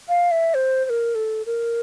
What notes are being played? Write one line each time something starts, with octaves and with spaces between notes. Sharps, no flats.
F5
E5
C5
C5
A#4
A4
A#4